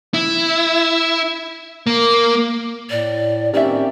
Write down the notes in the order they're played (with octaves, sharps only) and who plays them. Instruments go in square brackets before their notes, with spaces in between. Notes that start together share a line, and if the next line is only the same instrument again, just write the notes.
[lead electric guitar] E4
A#3
[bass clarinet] A2 [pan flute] D5
[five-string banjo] D#3 E5 [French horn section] A#3 C4 G4 [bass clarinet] C#4 [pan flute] D5